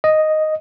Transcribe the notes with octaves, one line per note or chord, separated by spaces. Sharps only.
D#5